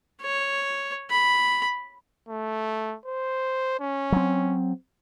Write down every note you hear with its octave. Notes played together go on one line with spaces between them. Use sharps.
C#5
B5
A3
C5
C#4
F#3 C4